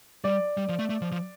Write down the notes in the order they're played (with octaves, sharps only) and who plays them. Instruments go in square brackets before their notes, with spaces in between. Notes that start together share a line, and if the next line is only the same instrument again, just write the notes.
[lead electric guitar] G3 [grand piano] D5
[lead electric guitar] G3
F3
A3
A3
F3
F3